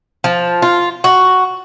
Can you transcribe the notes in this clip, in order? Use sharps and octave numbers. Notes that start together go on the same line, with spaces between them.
F3
F4
F#4